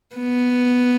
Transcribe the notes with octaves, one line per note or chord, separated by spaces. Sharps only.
B3